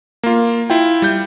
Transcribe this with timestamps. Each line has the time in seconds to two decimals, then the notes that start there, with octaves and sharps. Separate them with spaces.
0.23 A#3 F4
0.70 E4 F4 G5
1.02 G3 G6